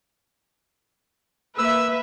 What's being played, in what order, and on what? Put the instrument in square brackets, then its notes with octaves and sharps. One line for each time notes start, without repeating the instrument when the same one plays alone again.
[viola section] A#3 B4 E5 [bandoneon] E6